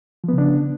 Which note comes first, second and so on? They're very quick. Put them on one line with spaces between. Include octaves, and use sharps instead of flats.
F3 B3 C#3 D4